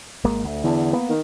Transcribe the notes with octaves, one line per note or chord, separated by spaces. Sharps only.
G#1 G#3 A#3
D2
E2 D3 D4
A#3 B3
D#3